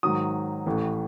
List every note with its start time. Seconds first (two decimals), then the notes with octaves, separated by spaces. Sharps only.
0.03 G#2 D#3 F#3 D#6
0.66 A1 A2 E3 A3